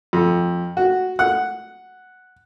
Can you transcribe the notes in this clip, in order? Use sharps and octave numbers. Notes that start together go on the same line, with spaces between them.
F2
F#4
F#5